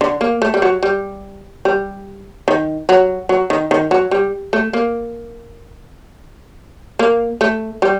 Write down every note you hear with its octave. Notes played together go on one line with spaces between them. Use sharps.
D3
A#3
A3
G3
F#3
G3
G3
D#3
F#3
F#3
D#3
D#3
F#3
G3
A3
A#3
A#3
A3
G3